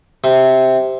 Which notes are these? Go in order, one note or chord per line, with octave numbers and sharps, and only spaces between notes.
C3